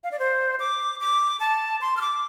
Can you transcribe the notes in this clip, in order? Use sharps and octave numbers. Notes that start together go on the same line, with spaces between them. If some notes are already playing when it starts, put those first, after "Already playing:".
F5
D5
C5
D6
D6
A5
C6
F6
D6